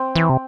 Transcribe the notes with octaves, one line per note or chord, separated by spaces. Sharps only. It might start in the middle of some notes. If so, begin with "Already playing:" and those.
Already playing: C4
E3
C3